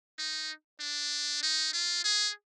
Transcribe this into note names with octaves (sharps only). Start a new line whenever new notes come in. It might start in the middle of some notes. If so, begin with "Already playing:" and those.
D#4
D4
D#4
F4
G#4